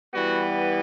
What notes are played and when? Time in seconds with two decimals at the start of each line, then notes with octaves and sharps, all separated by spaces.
0.14 E3 G3 B3 F#4